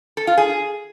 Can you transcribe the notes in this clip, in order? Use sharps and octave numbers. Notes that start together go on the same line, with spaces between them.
A4
F4
G#4